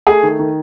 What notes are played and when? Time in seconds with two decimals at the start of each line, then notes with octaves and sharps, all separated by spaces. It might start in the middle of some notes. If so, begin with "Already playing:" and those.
0.07 A3 G#4
0.23 D#3
0.39 D#3